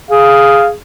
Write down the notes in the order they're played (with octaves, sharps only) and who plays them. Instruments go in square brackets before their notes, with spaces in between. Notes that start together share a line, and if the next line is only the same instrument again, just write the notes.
[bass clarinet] G#4 [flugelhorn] F5